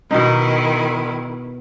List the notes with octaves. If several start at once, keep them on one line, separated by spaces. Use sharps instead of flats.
B2 D#3 D#4 E4